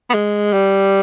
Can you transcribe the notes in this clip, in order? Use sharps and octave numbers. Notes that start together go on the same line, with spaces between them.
B3
G#3
G3